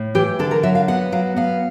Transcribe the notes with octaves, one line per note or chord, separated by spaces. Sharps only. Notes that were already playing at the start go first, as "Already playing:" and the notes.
Already playing: A2
E3 G4
D3 A4
A#4
F#3 E5
F5
B3 F#5
F#3 F5
B3 F5